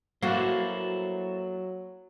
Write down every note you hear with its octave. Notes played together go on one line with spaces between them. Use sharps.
F#3 A#3 E4 F#4 A4 C5